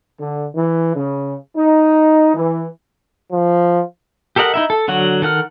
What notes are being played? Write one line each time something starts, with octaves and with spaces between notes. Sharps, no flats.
D3
E3
C#3
D#4
E3
F3
G4 A4 A#4 D#5 F#5
D#4 E4 E5
A4
D3 F#3 F#4 F#5
D#3 A4 F#5 F6